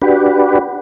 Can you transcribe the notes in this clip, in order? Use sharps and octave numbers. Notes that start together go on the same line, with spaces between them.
D4 F#4 G4 B4